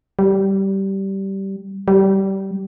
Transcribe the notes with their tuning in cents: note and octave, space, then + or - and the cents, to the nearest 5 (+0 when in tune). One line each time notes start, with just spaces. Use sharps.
G3 -15
G3 -20